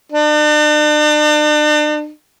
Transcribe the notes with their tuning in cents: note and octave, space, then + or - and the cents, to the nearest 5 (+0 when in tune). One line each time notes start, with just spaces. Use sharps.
D4 +40